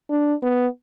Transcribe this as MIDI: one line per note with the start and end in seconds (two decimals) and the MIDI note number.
0.10 0.34 62
0.43 0.67 59